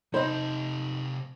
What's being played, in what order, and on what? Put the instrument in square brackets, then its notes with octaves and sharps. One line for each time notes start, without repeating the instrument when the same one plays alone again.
[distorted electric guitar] C3 A4 [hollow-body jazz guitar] D#4 B5 [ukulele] C5 D#5